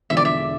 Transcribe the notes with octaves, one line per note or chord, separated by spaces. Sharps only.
E1 E2 D3 F3 G#3 E5
D5
E5